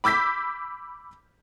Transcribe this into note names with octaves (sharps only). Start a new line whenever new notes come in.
B5 D6 E6 G6 B6